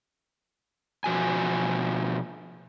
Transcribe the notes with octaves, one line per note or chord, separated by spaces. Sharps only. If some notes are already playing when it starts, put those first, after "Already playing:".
B2 F3 F#4 G#5